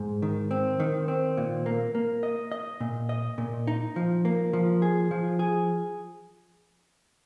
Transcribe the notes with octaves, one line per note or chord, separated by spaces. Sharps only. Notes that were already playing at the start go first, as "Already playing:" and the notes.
Already playing: G#2
D#3
C4
D#3
C4
A#2
A#3
A#3
D#5
D#5
A#2
D#5
A#2
D#4
F3
A#3
F3
G#4
F3
G#4